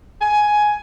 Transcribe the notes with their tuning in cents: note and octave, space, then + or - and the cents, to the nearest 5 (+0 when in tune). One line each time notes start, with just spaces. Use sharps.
G#5 +10